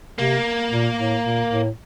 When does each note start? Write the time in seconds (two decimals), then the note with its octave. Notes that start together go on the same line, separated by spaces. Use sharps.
0.18 C3 A#3
0.71 A#2
0.98 A2
1.24 A#2
1.51 A2